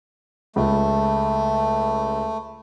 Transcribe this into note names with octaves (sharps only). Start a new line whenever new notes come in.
C#2 A3